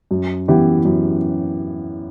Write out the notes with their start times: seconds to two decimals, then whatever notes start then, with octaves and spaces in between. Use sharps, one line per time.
0.11 F#2
0.48 E3 B3 E4 G4
0.85 F#2